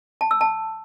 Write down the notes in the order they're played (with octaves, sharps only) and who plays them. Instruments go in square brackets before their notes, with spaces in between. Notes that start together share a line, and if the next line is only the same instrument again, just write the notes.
[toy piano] A5
E6
A5